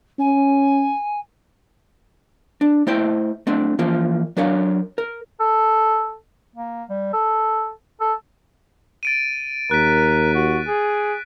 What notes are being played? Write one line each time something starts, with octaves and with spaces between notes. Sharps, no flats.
C#4 G#5
D4
A3 E4 C5 G5
A3 C4 D4
E3 F3 A#3 F4
F#3 D4 A#4 C#5 F5
A#4
A4
A#3
G3
A4
A4
A6 D7 D#7
D#2 A#4 F#6 B6
F#4
G#4